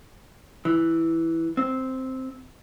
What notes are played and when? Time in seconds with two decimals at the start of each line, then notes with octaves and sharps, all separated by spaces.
0.65 E3
1.57 C4